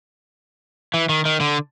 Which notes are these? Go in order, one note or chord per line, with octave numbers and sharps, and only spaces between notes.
E3
D#3
D#3
D3